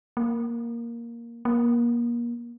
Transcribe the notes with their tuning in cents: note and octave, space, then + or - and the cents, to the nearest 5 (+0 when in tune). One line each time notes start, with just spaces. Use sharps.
A#3 +5
A#3 +30